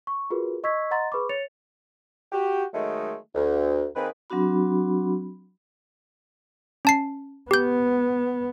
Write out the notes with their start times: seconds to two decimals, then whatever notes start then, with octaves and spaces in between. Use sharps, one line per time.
0.07 C#6
0.30 F4 F#4 G#4 A#4 B4
0.64 D#5 C#6 E6 G#6 B6
0.91 D#5 F#5 A#5 C6 A6
1.12 G#4 B4 B5 C#6 D6
1.29 C#5 A6 C#7 F7
2.32 F#4 G4
2.74 D#3 F#3 G#3 A3
3.35 D2
3.95 D#3 A#3 C4 G#4 B4
4.30 F#3 C4 D4 F#4 B5
6.85 C#4 A5 C7
7.51 B3 G4 G6